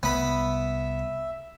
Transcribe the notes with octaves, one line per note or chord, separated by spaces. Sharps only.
C2 B3 E5 B5